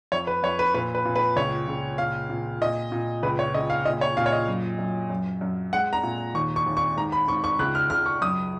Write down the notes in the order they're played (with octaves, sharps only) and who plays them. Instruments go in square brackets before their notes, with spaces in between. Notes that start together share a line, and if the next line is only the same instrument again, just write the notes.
[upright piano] F2 C#5
B4
F2 C#5
B4
A#2 B4
B4
A#2
B4
C#2 C#5
C#2
A#2 F5
A#2
A#2 D#5
A#2
C#2 B4
C#5
C#2 D#5
F5
A#2 D#5
C#5
A#2 F5
C#5
D#5
F#2
F#2
F#2
F#2
G#3 F#5
A#5
A#2
D#2 C#6
C#6
D#2
C#6
G#2 A#5
B5
G#2 C#6
C#6
C#2 F#6
F6
C#2 F6
C#6
F#2 D#6